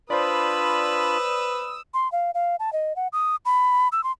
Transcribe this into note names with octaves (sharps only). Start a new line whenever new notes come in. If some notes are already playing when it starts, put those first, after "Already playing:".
D4 F4 B4 C5 D5 B5 D#6 E6
C6
F5
F5
A5
D#5
F#5
D#6
B5
E6
C6